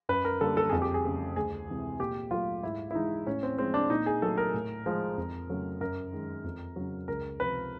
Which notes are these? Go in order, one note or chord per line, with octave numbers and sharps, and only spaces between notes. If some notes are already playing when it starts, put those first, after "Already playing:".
F#2 B4
A#4
D3 G3 A#3 A4
A4
F2 G#4
G4
G#4
C#3 F3 A3
D2 G#4
C3 E3 G#3
A#2 G4
F#3 A3 F4
G#2 E4
E4
E3 G#3 D#4
A2 C#4
C4
F3 G#3 C4
D4
A#2 D#4
G#4
F#3 A3 A4
A#4
A2
F3 G#3
F2
C#3 F#3 A3
F#2 A#4
D#3 G#3
F2
C#3 F#3
C#2 A#4
C3 F3 B4